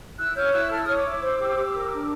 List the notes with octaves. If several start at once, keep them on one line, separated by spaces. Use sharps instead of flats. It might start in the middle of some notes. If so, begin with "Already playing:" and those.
E4 E6 F#6
C#5 F6 G6
E4 E6 F#6
A4 F6
E6
C#5 D#6 F6
D6 E6
E4
C5
G4
G4
A#4
D4